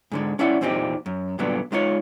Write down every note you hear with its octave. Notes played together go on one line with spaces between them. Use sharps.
G#2 D3 G#3
C#4 E4 D5 E5 F#5
E2 A#2 C4 D#4 G4
F#2
G2 A#2 D3 F#3 B3 D4
G#3 D#4 F4 C#5